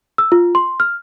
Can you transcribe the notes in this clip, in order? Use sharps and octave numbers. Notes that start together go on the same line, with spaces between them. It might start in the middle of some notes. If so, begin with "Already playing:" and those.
E6
F4
C6
F6